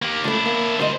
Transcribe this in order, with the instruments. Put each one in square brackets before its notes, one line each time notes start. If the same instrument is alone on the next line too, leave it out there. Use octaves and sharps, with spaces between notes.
[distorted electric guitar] A#3 G4
[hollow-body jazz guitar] C#2 A3 [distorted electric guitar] D4 E4
[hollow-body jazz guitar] A#3
[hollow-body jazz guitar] D2 G#2 D#5 [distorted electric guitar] G3 C5